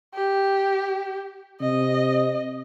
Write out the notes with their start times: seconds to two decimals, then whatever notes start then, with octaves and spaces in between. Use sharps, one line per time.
0.14 G4
1.61 C3 D#5